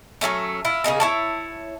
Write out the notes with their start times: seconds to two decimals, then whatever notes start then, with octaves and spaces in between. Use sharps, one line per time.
0.21 F#3 G3 A3 C#4
0.65 E4 F4
0.84 C#3 A#3 D#4 G#4
1.00 E4 C#5 A5